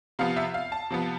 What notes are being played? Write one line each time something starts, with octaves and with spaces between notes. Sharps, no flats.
C3 F3 B3 F5
E5
F5
A5
C3 F3 B3